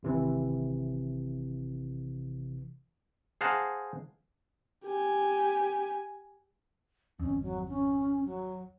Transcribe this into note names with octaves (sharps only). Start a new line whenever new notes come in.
G#1 C3 E3
G#4 C5 F5 F#5 A5 A#5
G4 G#5
G#1 F2 C#4
F#3
C#4
F#3